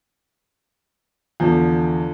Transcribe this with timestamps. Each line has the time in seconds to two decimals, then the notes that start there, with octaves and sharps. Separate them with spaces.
1.40 E2 D3 F3